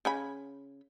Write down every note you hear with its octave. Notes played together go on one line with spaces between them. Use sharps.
C#3 G#5 B5